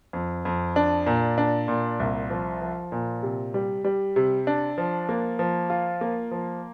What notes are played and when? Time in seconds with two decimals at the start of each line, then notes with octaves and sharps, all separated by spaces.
0.13 F2
0.45 F2
0.76 D4
1.06 A#2
1.38 D4
1.68 A#2
2.00 C2
2.30 F3
2.62 F3
2.92 A#2
3.22 C3
3.54 G3
3.84 G3
4.16 C3
4.47 D4
4.78 F3
5.09 A#3
5.39 F3
5.70 F4
6.01 A#3
6.31 F3